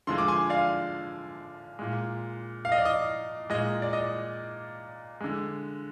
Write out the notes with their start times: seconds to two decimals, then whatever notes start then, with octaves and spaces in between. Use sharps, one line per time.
0.07 D3 F3 G#3 C6
0.18 D6
0.28 G#5 C6
0.50 D5 F5
1.79 A#2 G#3
2.65 F5
2.72 D#5
2.78 D5
2.85 D#5
3.50 A#2 G#3 D#5
3.82 D5
3.93 D#5
5.21 D3 G#3